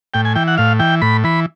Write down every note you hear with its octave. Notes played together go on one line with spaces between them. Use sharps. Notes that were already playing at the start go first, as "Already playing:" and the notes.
A2 G5
G#5
E3 G5
F#5
A2 F5
E3 G5
A2 B5
E3 B5